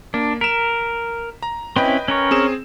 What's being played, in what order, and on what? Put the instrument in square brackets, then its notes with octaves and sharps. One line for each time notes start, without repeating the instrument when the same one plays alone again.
[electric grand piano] A#3 [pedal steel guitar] D4
[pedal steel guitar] A#4 [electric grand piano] B6 E7
[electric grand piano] A#5
[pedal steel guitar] C4 C#4 E4 [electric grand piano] B4 D#5 G5
[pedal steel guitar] C#4 A#4 C#5
[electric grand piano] C4 G#4 E7